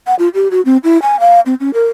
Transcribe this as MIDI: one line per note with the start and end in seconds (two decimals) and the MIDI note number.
0.07 0.15 78
0.19 0.29 65
0.34 0.48 67
0.51 0.61 66
0.65 0.77 60
0.84 1.01 64
1.02 1.19 80
1.20 1.40 77
1.46 1.55 60
1.60 1.71 61
1.74 1.88 70